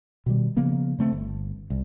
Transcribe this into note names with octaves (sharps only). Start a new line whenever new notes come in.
B2 D#3 G3
C#3 F3 A#3 B3
C#3 A3 C4
G1
C2